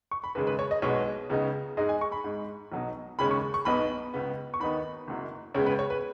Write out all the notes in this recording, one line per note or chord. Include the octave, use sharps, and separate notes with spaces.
C#6
B5
D#2 C#3 G#3 B4
B4
C#5
D#5
B1 B2 G#3 B3 C#5
C#2 C#3 B3 D#4
G#2 G#3 D#4 D#5
G#5
C#6
B5
G#2 G#3 D#4
B1 B2 F#3 D#4
D#2 C#3 G#3 C#4 B5
C#6
C#6
B1 B2 B3 D#4 B5
C#2 C#3 B3
C#6
D#2 D#3 B3 D#4 B5
F#1 F#2 F#3
C#2 C#3 G#3 B3 C#5
B4
C#5
B4